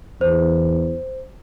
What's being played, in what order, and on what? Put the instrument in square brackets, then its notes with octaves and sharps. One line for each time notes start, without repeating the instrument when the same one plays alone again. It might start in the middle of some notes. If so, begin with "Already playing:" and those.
[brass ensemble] E2 [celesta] C5